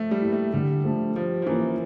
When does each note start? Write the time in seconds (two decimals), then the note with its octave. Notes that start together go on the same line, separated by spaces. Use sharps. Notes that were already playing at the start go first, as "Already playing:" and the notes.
Already playing: F3 A3
0.11 G3
0.22 A#3 E4
0.32 A3
0.53 D3 G3
0.84 F3 A3 D4
1.15 F3 G3
1.42 F3
1.47 E3 A#3 C#4 E4